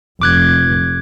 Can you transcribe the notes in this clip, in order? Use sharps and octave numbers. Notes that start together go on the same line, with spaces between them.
F1 D6 F#6 G#6